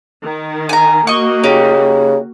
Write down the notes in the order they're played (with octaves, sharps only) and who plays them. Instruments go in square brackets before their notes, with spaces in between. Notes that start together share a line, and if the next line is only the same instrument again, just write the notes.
[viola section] D#3
[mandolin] G#5 A#5
[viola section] A#3 F#4 [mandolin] D#5 C#6
[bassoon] C#3 [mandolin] D#4 G4